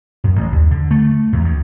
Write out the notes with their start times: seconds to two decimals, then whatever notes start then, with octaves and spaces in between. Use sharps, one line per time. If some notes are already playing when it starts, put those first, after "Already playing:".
0.24 F#2
0.36 A1
0.52 D#2
0.71 D3
0.91 A3
1.33 E2
1.44 D2